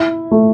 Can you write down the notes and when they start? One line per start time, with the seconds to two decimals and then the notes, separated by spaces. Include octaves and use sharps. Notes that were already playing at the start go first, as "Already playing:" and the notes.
Already playing: E4
0.31 A3